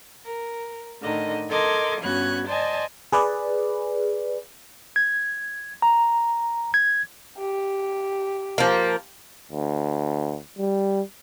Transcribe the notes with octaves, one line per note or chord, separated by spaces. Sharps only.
A#4
A2 D3 D#3 D#5
A4 A#4 D#5 C6 D6 G#6
G2 B3 C#4 F#4 F#6 G#6
C5 D5 D#5 G#5 A5
G#4 B4 D5
G#6
A#5
G#6
G4
F3 A#3
D2
G3